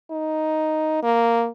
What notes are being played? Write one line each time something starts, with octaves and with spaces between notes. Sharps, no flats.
D#4
A#3